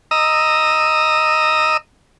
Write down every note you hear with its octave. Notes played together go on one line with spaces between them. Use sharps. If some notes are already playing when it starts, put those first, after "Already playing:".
D#5 A#5 D#6 E6